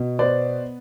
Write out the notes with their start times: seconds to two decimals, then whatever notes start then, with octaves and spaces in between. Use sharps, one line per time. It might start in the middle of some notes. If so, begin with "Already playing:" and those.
Already playing: B2
0.19 B3 C5 D5